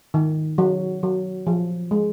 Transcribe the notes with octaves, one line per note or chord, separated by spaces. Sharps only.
D#3
F#3
F#3
F3
G#3